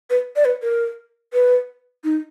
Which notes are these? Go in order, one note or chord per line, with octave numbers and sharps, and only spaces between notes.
B4
D5
B4
A#4
B4
D#4